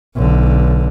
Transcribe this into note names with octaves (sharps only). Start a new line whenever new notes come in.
B1 D3